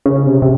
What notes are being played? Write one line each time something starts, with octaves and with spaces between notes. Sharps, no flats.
C#3
C3
C3